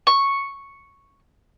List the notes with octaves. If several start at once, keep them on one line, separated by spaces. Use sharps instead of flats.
C#6